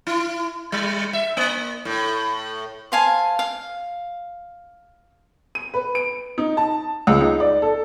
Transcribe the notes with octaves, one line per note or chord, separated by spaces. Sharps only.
E4
G3
E5
A#3
A2
C5 F5 G#5 A5
F5
D#7
B4
D7
D#4
A5
C#2
D#4
D5
A4